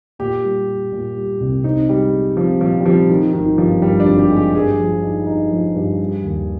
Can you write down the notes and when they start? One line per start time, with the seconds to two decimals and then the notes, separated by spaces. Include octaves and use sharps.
0.19 A#2 G4
0.43 G3
0.68 G3
0.92 A#2
1.17 G3
1.40 C2
1.64 C4 D#4
1.89 G3 G#3
2.13 G#3
2.37 F3 C4
2.61 A#2 F3
2.80 G3
2.85 F3 C4
3.09 D#3 F3
3.33 G#1 D#3
3.58 G2 F3
3.82 G2 G3
4.00 D4
4.07 G#1
4.19 G4
4.31 G#3
4.36 G4
4.55 G2 G#4
4.79 F3
5.03 D#4
5.27 D#4
5.51 F3
5.75 G2
6.00 G3
6.23 D#2